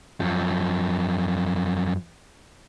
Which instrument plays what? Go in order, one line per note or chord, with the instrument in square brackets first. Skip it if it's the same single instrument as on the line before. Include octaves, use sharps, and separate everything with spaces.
[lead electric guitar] F#2 F3